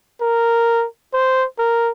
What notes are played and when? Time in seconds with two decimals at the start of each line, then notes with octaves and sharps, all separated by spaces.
0.21 A#4
1.13 C5
1.59 A#4